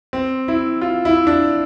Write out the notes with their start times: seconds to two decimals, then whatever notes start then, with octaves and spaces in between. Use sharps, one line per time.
0.13 C4
0.48 E4
0.81 F4
1.05 E4
1.27 D4